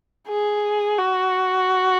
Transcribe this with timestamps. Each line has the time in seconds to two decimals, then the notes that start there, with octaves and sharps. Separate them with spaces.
0.29 G#4
0.99 F#4